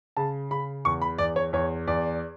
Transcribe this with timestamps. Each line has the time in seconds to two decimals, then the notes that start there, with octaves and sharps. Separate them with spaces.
0.17 C#3 A5
0.51 C#3 B5
0.85 E2 C#6
1.02 B5
1.18 E2 D5
1.36 C#5
1.53 E2 C#5
1.87 E2 D5